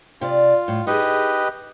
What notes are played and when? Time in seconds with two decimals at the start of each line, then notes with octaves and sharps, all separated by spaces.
0.21 C3 F4 D5
0.68 A2
0.87 D#4 G4 G#4 B4 D#5